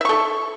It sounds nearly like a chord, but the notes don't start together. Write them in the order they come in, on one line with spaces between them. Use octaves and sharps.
E5 C#6 A4